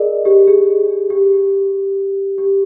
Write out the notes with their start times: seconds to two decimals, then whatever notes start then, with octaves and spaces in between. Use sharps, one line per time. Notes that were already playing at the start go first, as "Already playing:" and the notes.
Already playing: G#4 A#4 D5 D#5
0.25 G4
0.48 G#4
1.10 G4
2.38 G4